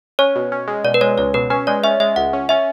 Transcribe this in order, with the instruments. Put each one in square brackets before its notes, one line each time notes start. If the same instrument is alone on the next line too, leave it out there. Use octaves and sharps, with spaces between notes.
[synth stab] C#4 [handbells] C#5
[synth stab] B2
C#4
G#3
[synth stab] B2 [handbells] D5
[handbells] B4
[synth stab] G#3 [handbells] C#5
[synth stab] C#2 [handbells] C#5
[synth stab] B2 [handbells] B4
[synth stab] C#4 [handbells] B4
[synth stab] G#3 [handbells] D5
[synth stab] C#4 [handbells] E5
[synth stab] G#3 [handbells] E5
[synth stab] C#2 [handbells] F#5
[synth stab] C#4
[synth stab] C#4 [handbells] E5